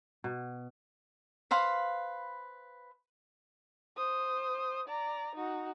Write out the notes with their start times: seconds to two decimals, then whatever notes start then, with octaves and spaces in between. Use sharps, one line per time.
0.24 B2
1.51 B4 C5 F5 B5
3.97 C5 D#6
4.88 D5 A#5
5.35 D#4 F#4